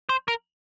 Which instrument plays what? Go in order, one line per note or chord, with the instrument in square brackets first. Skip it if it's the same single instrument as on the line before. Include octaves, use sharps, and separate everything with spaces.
[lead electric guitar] C5
A#4